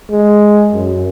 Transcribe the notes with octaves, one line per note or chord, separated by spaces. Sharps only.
G#3
F#2